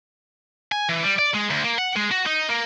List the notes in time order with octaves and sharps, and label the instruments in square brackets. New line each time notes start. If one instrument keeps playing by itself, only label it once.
[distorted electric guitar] G#5
E3
G3
D5
G#3
D2
A#3
F#5
G#3
F#4
D#4
A#3